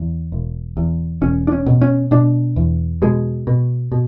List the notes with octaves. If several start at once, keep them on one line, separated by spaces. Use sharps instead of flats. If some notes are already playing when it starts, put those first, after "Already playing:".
Already playing: E2
E1
E2
E1 C#4
D4
C#4
B2
C#4
B2 D4
E2
B2 G#3
B2
B2